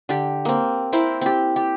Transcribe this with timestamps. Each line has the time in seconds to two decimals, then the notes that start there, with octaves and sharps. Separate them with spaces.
0.09 D3 G4
0.45 A#3 C4
0.93 C4 E4 A#4 C5
1.21 C4 G4
1.56 G4